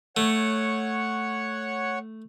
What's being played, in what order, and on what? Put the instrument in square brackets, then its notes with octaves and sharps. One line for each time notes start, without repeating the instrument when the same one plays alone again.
[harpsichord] A3 [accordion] C#5 F#5